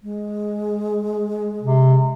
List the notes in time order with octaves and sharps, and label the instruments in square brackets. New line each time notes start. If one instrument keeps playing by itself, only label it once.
[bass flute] G#3
[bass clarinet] C3